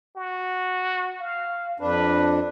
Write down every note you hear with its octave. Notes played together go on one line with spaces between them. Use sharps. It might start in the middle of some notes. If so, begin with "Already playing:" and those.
F#4
F5
F2 D4 B4